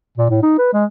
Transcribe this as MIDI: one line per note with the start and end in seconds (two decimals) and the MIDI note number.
0.17 0.29 46
0.30 0.39 45
0.43 0.55 63
0.58 0.70 71
0.73 0.85 56